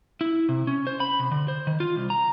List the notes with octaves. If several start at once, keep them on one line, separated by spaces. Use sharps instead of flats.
E4
C3
C#4
C5
B5
C3
D3
C5
D#3
F4
C2
A#5